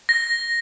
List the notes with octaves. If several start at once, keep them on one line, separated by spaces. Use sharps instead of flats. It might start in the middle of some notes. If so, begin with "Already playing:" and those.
A#6